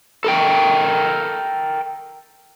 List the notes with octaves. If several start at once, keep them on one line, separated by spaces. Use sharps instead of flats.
A4 A#4 G5